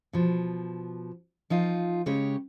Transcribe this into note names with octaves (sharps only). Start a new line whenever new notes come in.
B2 F3
F3 D#4 F4
C#3 G#3 G4 C#5